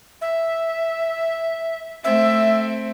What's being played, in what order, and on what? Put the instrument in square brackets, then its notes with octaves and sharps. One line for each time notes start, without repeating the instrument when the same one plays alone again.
[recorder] E5
[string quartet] A3 C4 [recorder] E5